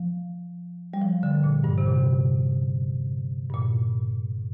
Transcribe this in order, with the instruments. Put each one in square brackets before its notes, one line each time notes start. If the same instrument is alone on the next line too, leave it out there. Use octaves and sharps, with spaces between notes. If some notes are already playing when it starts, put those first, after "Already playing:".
Already playing: [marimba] F3
G3
F3
D3
A#2
G2
C3
A#2
G2
A#2